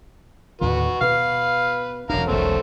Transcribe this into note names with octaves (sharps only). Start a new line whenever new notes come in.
D#2 A2 D3 F#4 B4
B2 B4 F5
E1 F#2 D4 F5 A#5
E1 B1 A3 B3 A4 C5